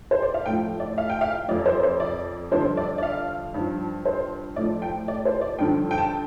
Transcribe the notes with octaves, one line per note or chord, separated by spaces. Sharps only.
C5
D5
F5
A2 F3 G5
D5
F5
G5
F5
F2 F3 D5
C5
C5
D5
G2 D3 F3 C5
D5
D5
F5
G2 F3
C5
A2 F3 D5
G5
D5
C5
D5
G2 D3 F3 G5
G5
A5